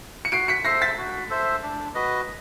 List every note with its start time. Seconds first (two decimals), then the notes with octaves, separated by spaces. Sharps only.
0.25 C#7
0.32 F#4 C7 D7
0.48 B6 C#7
0.65 A4 C5 E5 A#6 C7
0.82 A6 B6
0.98 F#4
1.30 A4 C5 E5
1.63 D4
1.95 F#4 B4 D#5